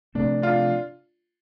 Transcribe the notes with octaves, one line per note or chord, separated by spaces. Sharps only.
C3 F3 A3 C4 D4
D4 F4